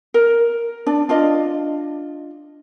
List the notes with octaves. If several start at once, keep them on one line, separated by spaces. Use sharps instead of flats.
A#4
D4 D5
D4 F4 D5 D#5